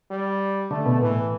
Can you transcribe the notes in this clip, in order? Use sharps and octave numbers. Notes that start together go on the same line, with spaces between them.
G3
D3 A3
B2
A2 E3